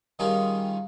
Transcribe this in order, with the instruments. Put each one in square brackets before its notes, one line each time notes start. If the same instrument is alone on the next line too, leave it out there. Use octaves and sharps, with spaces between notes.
[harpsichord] D#3 G3 C#4 D#4 F4 G#4